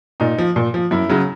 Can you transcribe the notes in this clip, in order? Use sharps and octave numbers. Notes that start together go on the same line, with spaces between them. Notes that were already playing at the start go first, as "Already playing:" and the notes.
A#2 D#4
F3
A#2
F3
F#2 E4
C#3 F#3